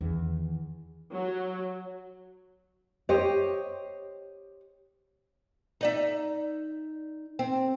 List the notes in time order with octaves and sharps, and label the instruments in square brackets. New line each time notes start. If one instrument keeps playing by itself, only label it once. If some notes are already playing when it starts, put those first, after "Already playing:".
[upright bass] E2 D#3
[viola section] F#3
[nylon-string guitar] G4 C5 C#5 D#5
[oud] D#4 D5 E5
C4